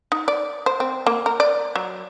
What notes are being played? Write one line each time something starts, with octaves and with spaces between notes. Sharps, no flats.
D#4
D5
C5
C4
A#3
A#4
D5
F#3